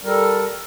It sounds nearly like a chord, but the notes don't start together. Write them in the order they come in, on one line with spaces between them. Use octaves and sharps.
G3 A#4 A4